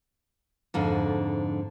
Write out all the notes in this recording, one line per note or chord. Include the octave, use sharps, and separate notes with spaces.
F2 G#2 D3